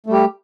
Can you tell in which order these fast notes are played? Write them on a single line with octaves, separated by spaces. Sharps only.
A3 G3 G4